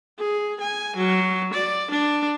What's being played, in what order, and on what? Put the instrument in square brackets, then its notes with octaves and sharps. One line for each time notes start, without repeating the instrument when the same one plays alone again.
[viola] G#4
G#5
F#3
D5
D4